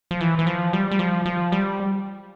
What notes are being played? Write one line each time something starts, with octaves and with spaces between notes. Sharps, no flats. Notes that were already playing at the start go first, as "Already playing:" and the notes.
F3
E3
E3
F3
G3
G3
F3
F3
G3